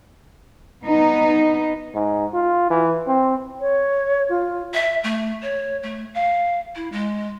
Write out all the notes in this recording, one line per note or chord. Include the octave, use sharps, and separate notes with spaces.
B3 D#4
G#2
F4
E3
C4
C#5
F4
E5
A3
C#5
A3
F5
E4
G#3